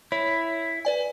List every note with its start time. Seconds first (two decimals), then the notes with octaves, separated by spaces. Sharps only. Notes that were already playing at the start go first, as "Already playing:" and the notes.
0.12 E4 C#5
0.85 B4 D5 G#5